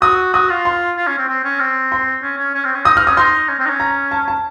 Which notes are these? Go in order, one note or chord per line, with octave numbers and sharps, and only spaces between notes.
F#4 D#6
F#4 D#6
F4
C6
F4
C#4
C4
C4
C#4
C4
C6
C#4
C#4
C#4
C4
C#4
D#4 D#6
F6
C#4 D#6
D#4 C6
C#4
C4
D#4
C#4
A#5
A5
A5